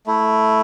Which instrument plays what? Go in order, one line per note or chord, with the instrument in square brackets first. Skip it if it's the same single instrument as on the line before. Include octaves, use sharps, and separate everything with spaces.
[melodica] A3 E4